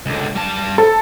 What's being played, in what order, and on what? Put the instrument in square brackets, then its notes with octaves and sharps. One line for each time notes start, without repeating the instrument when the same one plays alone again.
[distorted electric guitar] C#2 D3
G3 A5
[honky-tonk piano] A4